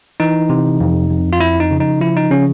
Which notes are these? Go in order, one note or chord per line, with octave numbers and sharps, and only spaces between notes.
E3 D#4
C3
F2
F2
F4
F3 E4
D#4
C#3
D#4
F3 E4
D#4
C#3 C#4